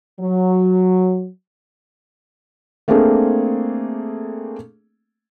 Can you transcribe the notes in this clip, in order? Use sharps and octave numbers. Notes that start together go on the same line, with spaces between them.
F#3
A3 A#3 C4 D4 G#4 A4